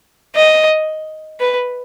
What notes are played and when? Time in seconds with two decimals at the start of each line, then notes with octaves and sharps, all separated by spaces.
0.35 D#5
1.40 B4